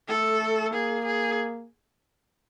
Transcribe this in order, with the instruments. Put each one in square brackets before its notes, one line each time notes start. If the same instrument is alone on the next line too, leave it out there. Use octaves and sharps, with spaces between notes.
[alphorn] A3 [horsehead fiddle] A4
[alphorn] A#3 [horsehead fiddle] G#4
[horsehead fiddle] G#4